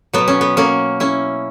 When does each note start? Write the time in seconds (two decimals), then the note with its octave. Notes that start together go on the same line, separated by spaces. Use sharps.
0.13 B2 F#3 B3
0.28 C#4
0.41 B3
0.57 A#3 C#4
1.00 C#4 E4